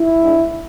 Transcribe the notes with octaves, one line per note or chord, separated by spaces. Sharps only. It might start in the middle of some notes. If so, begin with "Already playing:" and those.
Already playing: E4
G#2 G#3 D4